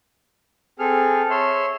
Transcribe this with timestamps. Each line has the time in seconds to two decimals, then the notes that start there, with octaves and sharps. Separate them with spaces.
0.79 C4 G#4 A4 F6
1.30 C#5 E5 C6